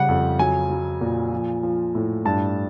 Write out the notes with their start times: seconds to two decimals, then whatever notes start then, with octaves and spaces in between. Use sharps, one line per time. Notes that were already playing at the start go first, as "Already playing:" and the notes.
Already playing: C#3 G3 F#5
0.08 F2
0.39 F#3 G#5
0.70 F#3
1.01 A#2
1.32 F3
1.63 F3
1.95 A2
2.25 G2 A5